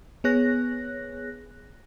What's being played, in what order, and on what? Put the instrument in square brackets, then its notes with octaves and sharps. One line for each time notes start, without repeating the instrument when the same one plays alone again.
[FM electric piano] B3 G#4 C#5 F#6 A#6